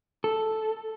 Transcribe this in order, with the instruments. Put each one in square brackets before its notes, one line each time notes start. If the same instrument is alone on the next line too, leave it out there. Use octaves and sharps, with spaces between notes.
[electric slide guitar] A4